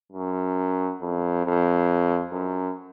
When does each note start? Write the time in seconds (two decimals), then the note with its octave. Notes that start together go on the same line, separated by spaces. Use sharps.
0.12 F#2
1.01 F2
1.45 F2
2.32 F#2